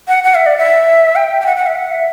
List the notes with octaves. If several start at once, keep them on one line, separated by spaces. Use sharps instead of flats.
F#5
F#5
E5
D5
E5
G5
G5
F#5
F#5
E5
F#5
E5